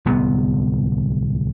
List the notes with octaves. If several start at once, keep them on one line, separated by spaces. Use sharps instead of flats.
D1 C2 B3